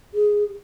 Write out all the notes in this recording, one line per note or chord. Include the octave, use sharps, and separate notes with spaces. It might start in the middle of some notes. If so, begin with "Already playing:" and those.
G#4